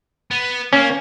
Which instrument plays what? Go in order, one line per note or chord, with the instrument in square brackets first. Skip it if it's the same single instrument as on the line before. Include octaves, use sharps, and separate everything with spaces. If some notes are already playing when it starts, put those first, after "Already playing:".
[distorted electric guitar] B3
[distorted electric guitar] A#3 [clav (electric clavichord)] C#4